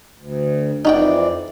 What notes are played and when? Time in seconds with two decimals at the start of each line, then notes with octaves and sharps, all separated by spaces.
0.18 D2
0.85 F2 E3 D#4 F#4 D5 G5